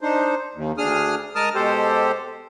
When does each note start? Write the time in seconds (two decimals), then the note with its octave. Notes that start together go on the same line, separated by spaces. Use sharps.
0.01 D4 D#4 C5
0.54 D#2
0.78 D2 D4 G#4 D#6 F6
1.35 G#3 A#4 A5 D#6 F6
1.55 B2 G#3 G4 A4 C5